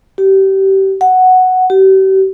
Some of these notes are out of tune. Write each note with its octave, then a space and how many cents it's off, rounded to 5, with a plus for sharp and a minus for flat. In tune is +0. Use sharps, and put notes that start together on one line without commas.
G4 -25
F#5 +0
G4 -40